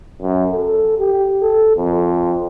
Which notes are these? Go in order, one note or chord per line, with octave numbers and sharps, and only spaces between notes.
F#2
A4
G4
A4
F2